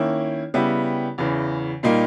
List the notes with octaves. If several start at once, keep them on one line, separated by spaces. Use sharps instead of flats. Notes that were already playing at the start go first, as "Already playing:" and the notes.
Already playing: D#3 A#3 C#4 E4
C#3 G3 B3 E4 G4
E2 C#3 E3
A#2 G3 A#3 D#4